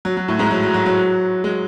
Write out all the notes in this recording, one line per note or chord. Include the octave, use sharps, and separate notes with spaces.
F#3
F#3
A2 A3
G#2 G#3
F#3
F#3
F#3
F#3
G#3